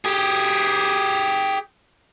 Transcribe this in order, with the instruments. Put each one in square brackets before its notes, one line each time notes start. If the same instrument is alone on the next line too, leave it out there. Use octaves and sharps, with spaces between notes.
[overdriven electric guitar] G4 G#4